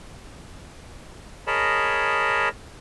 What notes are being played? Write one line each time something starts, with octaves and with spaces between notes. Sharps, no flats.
G#4 A#4 C#5 D#5 A5 B5